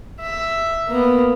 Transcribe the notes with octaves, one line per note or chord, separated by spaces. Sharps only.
E5
A#3 B3